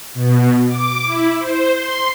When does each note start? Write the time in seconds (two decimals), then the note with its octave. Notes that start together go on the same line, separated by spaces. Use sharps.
0.14 B2
0.67 D6
1.05 E4
1.39 C5
1.71 C6